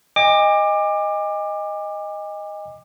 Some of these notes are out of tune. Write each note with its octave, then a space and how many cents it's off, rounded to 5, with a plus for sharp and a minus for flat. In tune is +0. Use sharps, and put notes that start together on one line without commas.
D#5 +0 G#5 -40 D6 +20